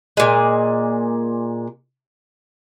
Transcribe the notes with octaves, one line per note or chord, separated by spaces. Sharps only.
A#2 G#3